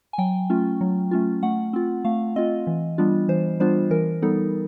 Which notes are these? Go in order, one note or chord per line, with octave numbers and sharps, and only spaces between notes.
G#5
F#3 G5
A3 C#4 F4
F#3
A3 C#4 F4
A3 F#5
C4 F4
A3 F5
C4 F4 D#5
E3
G3 B3 D4 F4
E3 C5
G3 B3 D4 F4 C5
E3 A#4
G3 B3 D#4 A4